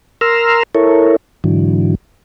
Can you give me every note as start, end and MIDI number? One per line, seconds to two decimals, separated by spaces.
0.21 0.63 70
0.21 0.63 82
0.21 0.63 84
0.21 0.63 88
0.21 0.63 89
0.75 1.16 64
0.75 1.16 69
0.75 1.16 70
0.75 1.16 73
1.44 1.95 44
1.44 1.95 50
1.44 1.95 52
1.44 1.95 54